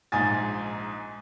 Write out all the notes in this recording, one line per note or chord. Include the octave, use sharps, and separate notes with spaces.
A#1 G#2 D#4 G#5 D#6 A6